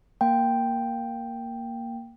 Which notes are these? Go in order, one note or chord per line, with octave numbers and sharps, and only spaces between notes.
A#3 G5